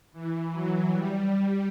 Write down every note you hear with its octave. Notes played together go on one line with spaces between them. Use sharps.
E3
F#3
G3